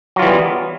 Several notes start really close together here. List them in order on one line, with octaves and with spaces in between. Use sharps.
F#3 F4 E3 G3 B3